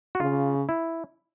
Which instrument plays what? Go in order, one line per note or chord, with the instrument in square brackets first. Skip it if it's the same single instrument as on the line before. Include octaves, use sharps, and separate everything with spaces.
[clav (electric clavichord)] F#4
[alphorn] C#3 [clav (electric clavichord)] F4
[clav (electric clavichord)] E4